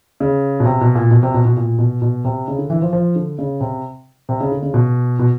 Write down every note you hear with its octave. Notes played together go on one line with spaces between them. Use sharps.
C#3
B2
C3
B2
A#2
B2
C3
B2
B2
A#2
B2
B2
C3
C#3
D3
E3
F3
F3
D3
C#3
C3
C3
C#3
D3
C#3
B2
B2